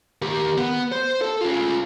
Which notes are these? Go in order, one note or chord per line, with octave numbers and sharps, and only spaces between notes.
D#3 G4
B3
C5
A4
C#4 F4